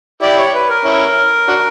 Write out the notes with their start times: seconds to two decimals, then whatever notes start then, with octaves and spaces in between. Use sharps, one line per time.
0.22 E4 G4 D5
0.38 C#5
0.54 B4
0.69 A#4
0.85 C#4 E4
1.48 D4 F#4